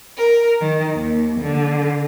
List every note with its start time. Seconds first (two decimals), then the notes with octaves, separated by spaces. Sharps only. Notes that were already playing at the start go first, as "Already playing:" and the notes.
0.17 A#4
0.61 D#3
0.97 D#2
1.40 D3